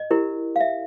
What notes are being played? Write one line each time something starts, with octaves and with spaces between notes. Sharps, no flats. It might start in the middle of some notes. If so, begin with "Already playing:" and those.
Already playing: D#5
E4 G4 A#4
F5
E5